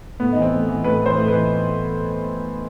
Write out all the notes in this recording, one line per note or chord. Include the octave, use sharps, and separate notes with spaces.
A2 B3
E3 D#4
C4
A2
E3
A2 B4
E3 C5
A2
E3 B4